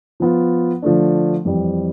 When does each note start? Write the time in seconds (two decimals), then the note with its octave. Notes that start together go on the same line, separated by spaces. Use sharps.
0.20 F3 B3 F4
0.82 D3 F3 A3 D4
1.45 F2 E3 G3 C4